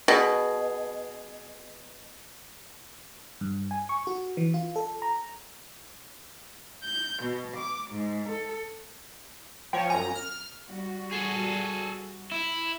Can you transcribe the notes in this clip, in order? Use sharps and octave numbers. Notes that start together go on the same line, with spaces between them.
B2 G#4
G2
G#5
C#6
F#4
E3
F4
A4
A#5
G6
B2
D6
G#2
A4
F3 C#5 G5
F#2 G#5 A#5
F6
G3 F#4
G#4 A4
E4